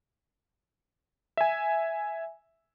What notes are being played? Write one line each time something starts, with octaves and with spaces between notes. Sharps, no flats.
E5 G#5